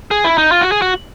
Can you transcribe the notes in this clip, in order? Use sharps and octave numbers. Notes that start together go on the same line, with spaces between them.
G#4
E4
D#4
F4
F#4
G#4
F#4